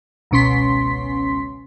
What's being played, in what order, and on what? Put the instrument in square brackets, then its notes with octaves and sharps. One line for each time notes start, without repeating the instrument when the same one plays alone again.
[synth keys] G#1 C#2 B2 C#4 C6 B6